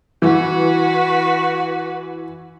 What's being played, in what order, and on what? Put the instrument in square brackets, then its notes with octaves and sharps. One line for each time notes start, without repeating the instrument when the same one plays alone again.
[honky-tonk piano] E3 [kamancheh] F#4 B4